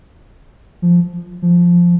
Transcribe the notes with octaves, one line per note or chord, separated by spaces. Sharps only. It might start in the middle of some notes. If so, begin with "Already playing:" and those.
F3
F3